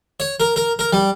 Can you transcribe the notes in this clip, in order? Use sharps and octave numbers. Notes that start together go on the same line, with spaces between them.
C#5
A#4
A#4
A#4
G3